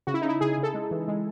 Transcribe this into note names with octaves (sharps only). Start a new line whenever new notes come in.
C#3 F#4
E4
D#4
C#3 E4
C#3 G#4
G#4
C#3
A4
G#3
E3
G#3